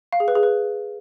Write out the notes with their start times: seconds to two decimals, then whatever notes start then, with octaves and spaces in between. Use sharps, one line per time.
0.13 F5
0.20 G#4
0.28 B4
0.35 G#4
0.43 B4